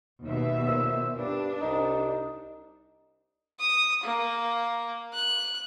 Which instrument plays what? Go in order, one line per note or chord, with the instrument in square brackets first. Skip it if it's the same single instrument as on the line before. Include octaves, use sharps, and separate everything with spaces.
[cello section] D#2 B2 E5
[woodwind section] A#2 C5 E6
[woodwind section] G2 [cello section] D4
[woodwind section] C2 D#4
[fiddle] D#6
A#3
F#6